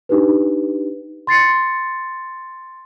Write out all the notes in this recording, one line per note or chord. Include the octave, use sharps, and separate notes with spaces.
D4 D#4 G4 B4
C6 A6 C7 C#7